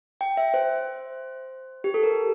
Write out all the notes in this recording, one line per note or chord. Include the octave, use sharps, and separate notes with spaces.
G5
E5
C5
G4
A4
A#4